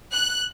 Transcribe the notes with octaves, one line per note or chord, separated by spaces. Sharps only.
F#6